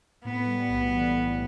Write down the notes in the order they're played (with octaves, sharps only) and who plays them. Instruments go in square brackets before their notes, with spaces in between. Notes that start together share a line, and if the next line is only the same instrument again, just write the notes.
[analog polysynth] A2 [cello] B3
[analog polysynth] G3
B1
E3
A2